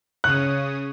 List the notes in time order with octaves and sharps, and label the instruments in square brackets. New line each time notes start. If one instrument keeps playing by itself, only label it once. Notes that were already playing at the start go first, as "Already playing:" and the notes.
[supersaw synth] C#3 C#5 D#6 [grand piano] F#6